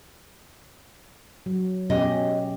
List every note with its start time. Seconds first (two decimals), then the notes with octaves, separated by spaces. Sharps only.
1.46 F#3
1.90 B2 C#4 G4 D#5